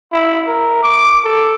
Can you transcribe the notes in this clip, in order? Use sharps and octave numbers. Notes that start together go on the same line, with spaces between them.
E4
A#4
D6
A4